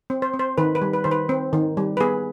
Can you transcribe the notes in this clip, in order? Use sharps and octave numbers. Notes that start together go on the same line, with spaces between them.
C4
C5
C4
C5
D#3 B4
B4
G3
B4
D#3 C5
B4
C4
D#3
G3
B4
B3 G#4